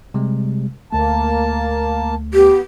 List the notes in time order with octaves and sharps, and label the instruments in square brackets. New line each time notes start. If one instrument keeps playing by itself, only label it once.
[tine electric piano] C3 G3 G#3
[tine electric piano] D2 A3 [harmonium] A#3 A5
[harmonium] B3 [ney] G4